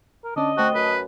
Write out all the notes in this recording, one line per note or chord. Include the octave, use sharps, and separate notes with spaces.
A#4
D3 C#4 D4 D#5
A3 C4 F#4 A5
F#2 B4